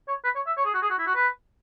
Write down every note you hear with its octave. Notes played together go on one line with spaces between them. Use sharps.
C#5
B4
C#5
E5
C#5
G#4
F#4
G#4
F#4
E4
F#4
B4